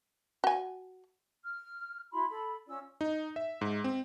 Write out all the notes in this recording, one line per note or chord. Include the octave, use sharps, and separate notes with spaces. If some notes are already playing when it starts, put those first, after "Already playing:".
F#4 G#5
F6
E4 F#4 B5 C6
A4 B5
C#4 F4 D5 E6
D#4
E5
G#2
C4